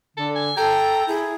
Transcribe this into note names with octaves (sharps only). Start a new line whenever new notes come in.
D3 A4
G#5
A4 G5 A#5
E4 G#4